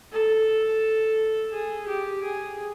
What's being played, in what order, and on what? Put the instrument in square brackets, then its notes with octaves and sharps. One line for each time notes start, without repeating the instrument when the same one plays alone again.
[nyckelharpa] A4
G#4
G4
G#4